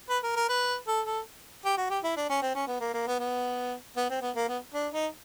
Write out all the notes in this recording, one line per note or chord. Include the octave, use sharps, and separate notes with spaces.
B4
A#4
A#4
B4
A4
A4
G4
F#4
G4
E4
D4
C#4
C4
C#4
B3
A#3
A#3
B3
B3
B3
C4
B3
A#3
B3
D4
D#4